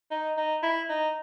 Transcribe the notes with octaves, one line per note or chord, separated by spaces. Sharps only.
D#4
D#4
E4
D#4